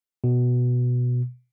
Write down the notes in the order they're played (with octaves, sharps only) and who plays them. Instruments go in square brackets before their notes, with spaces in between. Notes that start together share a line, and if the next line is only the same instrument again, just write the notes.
[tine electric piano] B2